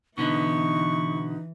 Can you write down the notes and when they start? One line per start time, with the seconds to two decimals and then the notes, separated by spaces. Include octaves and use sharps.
0.18 B2 D3 E3 B3 D#4 C#6